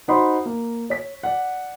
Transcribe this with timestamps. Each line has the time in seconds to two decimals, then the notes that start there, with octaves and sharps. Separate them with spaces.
0.08 D#4 F#4 C5 F#5 B5 C6
0.46 A#3
0.90 C#5 B6
1.23 D5 F#5